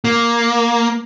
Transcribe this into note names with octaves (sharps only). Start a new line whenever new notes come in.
A#3